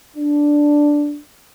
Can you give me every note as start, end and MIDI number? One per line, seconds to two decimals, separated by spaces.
0.17 1.18 62